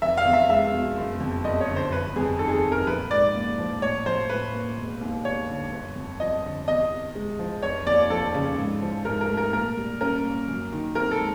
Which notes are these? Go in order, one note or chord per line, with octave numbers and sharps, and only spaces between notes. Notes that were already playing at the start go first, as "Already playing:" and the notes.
F1 E5
F5
E2
E5
G#3 E5
B2
F#1
F2
F#1 D#5
C#5
D3
C5
G1 B4
F2 G#4
D#3 A4
G#4
A4
C3
A#4
A#1 B4
G#2 D5
A#3
F3
A2 C#5
F3 C5
A2 B4
A#3
E1
D#2
E1 C#5
D3
G1
F2
F3 D#5
D3
E2 D#5
C3
G#3
F3
F1 C#5
D#2 D5
F3 A4
C#3
G#2
F3
G#2 A#4
A#4
A3
A#4
A#2 A#4
G3
C#4 A#4
A#3
F#2
D#3
C4 A#4
A4
G#3